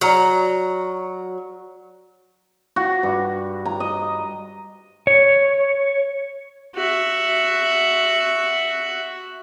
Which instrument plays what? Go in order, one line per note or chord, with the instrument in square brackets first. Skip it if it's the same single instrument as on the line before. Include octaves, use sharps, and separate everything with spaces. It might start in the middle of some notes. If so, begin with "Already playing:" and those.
[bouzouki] F#3 [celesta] D5 A#5 F6
[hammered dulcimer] F#4
G2
A#5
D#5
[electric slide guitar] C#5
[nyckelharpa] F#4 E5